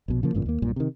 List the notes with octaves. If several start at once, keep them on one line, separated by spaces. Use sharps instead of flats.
A#1 B2
C#3 F3 A#3
A1 G2 A#2 C#3
D#2 A#3
B1 G2 A#2
C3 D#3